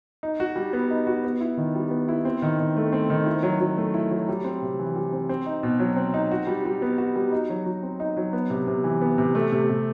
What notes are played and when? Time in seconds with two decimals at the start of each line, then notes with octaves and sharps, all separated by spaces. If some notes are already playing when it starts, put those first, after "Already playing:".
0.23 D#4
0.40 F#4
0.56 G3
0.73 B3
0.91 D#4
1.07 F#4
1.24 B3
1.41 E4
1.57 D#3
1.75 G3
1.91 B3
2.08 E4
2.25 C4
2.42 D#3
2.60 D#3
2.76 A3
2.92 C4
3.10 D#3
3.26 E4
3.43 F#3
3.60 F#3
3.78 A3
3.94 E4
4.11 F#3
4.29 G3
4.44 C4
4.62 C3
4.79 E3
4.96 G3
5.13 C4
5.29 C4
5.46 D#4
5.63 B2
5.80 F#3
5.96 C4
6.14 D#4
6.31 F#4
6.47 G3
6.65 G3
6.82 B3
6.98 F#4
7.16 G3
7.32 D#4
7.50 F#3
7.66 F#3
7.83 C4
8.00 D#4
8.17 F#3
8.33 B3
8.50 C3
8.67 C3
8.84 E3
9.02 B3
9.18 C3
9.35 A3
9.52 C3
9.69 C3